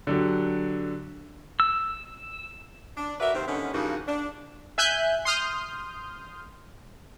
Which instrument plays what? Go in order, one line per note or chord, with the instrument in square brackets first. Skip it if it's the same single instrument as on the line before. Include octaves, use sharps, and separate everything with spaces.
[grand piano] D3 F#3 G4
[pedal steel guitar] E6
[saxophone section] D4
F#4 A#4 B4 D5 E5
C3 D#3 A#3 C4
G2 D3 D#3 B3 C#4
G2 C#3 F3 A#3 D#4 F#4
D4
[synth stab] E5 G#5 F#6 G6
C6 D#6 F6 G6